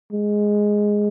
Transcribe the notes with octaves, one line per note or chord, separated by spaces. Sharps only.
G#3